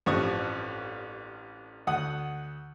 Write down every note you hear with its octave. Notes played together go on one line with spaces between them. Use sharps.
A1 G2 F3 C4 C#6 D#6
D2 F#5 D#6